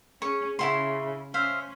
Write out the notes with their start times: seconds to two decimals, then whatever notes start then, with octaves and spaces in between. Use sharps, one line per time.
0.22 C#4 G#4 C#6
0.59 C#3 C#4 E4 F#4 G#4 E5 C6
1.34 C#4 C5 E5 F5 C6